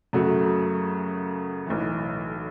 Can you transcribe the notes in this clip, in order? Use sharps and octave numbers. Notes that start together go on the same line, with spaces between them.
F#2 C#3 A3 F#4
B1 A2 E3